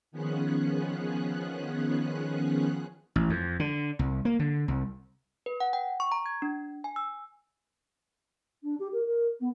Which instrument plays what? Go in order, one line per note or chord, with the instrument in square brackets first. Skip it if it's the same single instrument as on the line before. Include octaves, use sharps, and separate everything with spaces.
[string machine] D#3 F3 B3 C#4 G#4 F#6
[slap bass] A1
F2
D3
C2
A#3
D3
C2
[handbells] B4
F#5
G5
C#6
A#5
G#6
D4
G#5
E6
[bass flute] D4
G4
A#4
A#4
B3